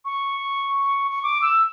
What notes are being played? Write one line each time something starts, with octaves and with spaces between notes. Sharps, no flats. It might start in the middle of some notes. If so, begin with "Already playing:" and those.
C#6
C#6
D6
E6